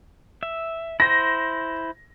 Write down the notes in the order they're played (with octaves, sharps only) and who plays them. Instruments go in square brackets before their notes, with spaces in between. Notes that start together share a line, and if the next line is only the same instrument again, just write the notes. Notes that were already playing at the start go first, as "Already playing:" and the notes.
[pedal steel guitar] E5
[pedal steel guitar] E4 C5 [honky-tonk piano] A#6